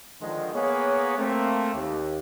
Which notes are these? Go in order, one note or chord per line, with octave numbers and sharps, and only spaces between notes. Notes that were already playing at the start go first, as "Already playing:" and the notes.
D3 D#3 F3 G#3
A#3 B3 G#4 C#5
A3 A#3 C4
D#2